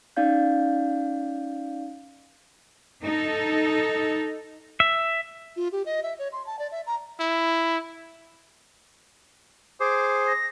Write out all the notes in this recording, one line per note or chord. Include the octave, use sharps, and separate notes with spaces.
C#4 D#4 D5 F5 G6
D#4 A4
E5
F4
G4
D#5
E5
C#5
C6
A5
D5
E5
A#5
E4
G#4 C5 D6
A#6